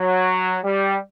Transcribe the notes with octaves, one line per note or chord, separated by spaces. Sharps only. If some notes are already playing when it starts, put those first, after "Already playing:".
Already playing: F#3
G3